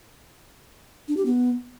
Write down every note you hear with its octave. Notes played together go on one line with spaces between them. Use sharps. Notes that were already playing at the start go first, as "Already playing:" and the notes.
D4
G4
B3